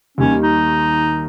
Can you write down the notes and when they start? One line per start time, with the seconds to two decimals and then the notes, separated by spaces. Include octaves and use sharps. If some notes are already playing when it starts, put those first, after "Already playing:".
0.18 D#2 D#3 G3 A#3 C#4
0.43 D#4